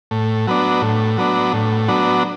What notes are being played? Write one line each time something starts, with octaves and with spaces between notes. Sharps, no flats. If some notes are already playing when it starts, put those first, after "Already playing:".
A2
F#3 B3 D4
A2
F#3 B3 D4
A2
F#3 B3 D4